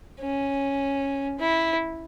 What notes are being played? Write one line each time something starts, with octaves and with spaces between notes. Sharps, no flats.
C#4
E4